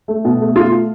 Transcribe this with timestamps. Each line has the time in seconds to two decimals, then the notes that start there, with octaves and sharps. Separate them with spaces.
0.08 A3
0.25 B2
0.41 A3
0.56 A3 F4